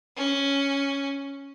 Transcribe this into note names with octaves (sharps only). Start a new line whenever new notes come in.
C#4